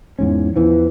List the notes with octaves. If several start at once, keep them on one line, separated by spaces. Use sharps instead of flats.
E2 G#2 C#4
E2 E3 F3